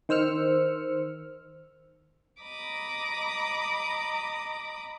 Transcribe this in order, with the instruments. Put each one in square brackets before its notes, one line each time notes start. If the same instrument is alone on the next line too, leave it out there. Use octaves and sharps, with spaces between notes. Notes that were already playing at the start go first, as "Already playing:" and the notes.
[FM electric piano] D#3 C5 E6 F6 C#7
[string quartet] D#5 A#5 B5 D6 D#6